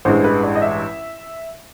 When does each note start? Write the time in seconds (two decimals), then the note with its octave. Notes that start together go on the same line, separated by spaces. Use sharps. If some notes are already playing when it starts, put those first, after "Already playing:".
0.05 A1 G2 E3 G#3 C5
0.24 B4
0.43 D5
0.55 D#5
0.62 E5